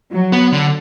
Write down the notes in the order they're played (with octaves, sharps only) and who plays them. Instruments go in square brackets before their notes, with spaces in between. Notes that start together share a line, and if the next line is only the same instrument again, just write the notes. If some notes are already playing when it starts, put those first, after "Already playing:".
[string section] F#3
[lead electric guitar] B3
D3